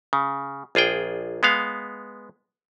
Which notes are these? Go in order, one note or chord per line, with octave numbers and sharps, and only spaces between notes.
C#3
A#1 F4 G#4 G5
G#3 B3 F5